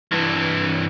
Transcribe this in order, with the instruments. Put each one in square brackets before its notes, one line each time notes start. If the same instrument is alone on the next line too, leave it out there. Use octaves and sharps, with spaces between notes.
[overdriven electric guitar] G2 E3